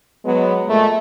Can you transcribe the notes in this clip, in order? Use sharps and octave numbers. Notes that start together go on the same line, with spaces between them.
F#3 G#3 B3
A#2 G#3 A3